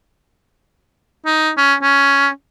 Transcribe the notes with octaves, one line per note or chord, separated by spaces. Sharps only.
D#4
C#4
C#4